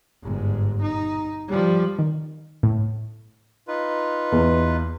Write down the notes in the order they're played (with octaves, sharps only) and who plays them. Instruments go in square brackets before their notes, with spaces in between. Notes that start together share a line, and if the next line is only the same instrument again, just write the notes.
[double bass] G1 G#2
D#4
F3 G3
[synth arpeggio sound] D#3
A2
[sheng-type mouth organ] D#4 F4 B4
[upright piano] E2